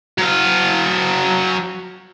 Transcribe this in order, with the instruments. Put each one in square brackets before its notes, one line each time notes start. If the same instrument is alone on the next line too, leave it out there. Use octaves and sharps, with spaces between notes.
[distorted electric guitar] F#3 F5